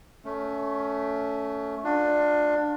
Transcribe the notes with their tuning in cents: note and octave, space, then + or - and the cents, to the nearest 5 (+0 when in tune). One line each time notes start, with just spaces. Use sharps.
A3 +0 C#4 +20
A3 +0 D4 +15 F4 +35